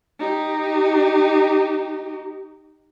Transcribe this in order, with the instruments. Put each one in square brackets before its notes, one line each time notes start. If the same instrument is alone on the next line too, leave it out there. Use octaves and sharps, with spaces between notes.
[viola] D#4 G4